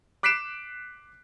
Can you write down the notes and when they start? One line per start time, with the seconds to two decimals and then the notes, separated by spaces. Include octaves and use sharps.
0.23 D6 F#6 B6 C7 D7 E7